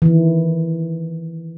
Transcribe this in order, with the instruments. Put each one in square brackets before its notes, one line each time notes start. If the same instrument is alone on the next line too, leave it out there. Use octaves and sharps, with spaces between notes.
[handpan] D#3 E3